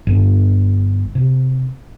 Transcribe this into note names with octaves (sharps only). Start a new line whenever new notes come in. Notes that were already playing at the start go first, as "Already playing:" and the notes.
G1
C3